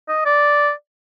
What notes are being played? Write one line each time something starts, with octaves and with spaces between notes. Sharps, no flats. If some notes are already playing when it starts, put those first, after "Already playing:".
D#5
D5